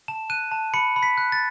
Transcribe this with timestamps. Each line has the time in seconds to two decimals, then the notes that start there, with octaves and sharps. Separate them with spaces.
0.08 A5 E7
0.30 F#6 D#7
0.52 A5
0.74 B5 C#7
0.96 B5
1.03 B6
1.18 F#6
1.32 A6